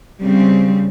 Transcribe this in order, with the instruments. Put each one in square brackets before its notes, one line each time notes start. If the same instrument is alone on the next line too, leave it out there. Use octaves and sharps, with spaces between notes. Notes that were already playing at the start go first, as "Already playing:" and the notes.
[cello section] C#3 G3 C4